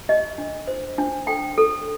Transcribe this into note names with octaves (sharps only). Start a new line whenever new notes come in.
G4 D#5
D4
C5
D4
A4 G5
A4